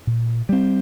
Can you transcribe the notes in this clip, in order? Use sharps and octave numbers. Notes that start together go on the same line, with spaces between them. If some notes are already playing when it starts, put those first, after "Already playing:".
A#2
G3 C4